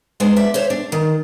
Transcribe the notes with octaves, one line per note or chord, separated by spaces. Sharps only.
G#3 B3 D4 C5
D5 E5
C5 C#5 E5
D4
D#3